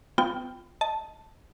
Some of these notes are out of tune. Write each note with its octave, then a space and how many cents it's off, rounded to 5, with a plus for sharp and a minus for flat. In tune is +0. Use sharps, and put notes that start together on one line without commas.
B3 +30 F4 +0 G5 +0
D#5 +15 A5 +0